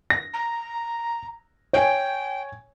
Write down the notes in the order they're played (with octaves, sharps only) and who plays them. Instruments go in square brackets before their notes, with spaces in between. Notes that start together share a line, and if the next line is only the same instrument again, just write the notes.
[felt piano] A#6
[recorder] A#5
[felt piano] C#5 G#5 [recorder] G5